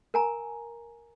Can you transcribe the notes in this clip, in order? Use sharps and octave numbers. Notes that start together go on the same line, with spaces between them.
A#4 G#5 A#5